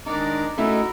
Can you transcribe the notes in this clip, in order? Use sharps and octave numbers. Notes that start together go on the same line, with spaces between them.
D#3 G#3 D4 D#4 A#4 D5
A3 C#4 D#4 E4 F#4 A#4 B5 E6